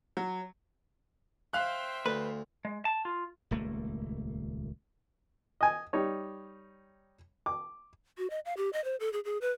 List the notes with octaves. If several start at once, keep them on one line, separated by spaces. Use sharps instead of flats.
F#3
C5 E5 F5 G5 F#6
D2 B4
G#3
A5
F4
D#1 C#2 A3 A#3
D#5 G#5
G3 D#4 C#5
D6
F#4
D#5
F5
G4
D#5
C5
A4
G#4
G#4
B4